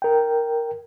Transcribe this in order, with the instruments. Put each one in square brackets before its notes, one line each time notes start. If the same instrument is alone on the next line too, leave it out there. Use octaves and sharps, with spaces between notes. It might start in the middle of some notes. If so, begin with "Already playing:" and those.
[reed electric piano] A#4 G5